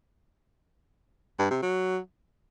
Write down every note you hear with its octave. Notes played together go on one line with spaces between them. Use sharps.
G2
C3
F#3